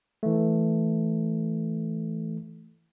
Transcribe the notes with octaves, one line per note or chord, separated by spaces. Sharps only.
E3 A3